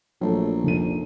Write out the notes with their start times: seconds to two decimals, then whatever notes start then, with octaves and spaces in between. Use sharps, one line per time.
0.21 A#1 F#3 A3
0.64 F1 D#7